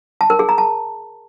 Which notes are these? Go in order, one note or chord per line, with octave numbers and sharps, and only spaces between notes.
A5
A#4
G#4
A#5
A5